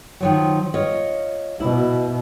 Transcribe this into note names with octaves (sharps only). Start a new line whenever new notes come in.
D#3 F3 F#3
F4 C#5 D#5
B2 E4